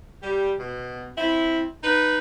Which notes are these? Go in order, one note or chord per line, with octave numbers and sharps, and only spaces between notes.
G3
B2
C4 E4
D#4 B4